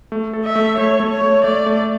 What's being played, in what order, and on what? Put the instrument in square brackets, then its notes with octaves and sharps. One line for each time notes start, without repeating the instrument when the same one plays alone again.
[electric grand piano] A3
A4
[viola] E5
[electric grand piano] A3
[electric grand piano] A3 [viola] C#5
[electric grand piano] A3
[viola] C#5
[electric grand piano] A3
[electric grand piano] A3 [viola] D5
[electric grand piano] A3